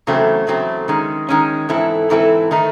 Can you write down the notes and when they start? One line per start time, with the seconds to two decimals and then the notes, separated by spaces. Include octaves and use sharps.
0.07 E2 C#3 F#3 A3 C4
0.47 E2 C#3 F#3 A3 C4
0.88 D#3 G#3 C#4
1.29 D#3 G#3 C#4
1.69 G#2 E3 C4 E4 A4
2.10 G#2 E3 C4 E4 A4
2.51 D#3 A3 D#4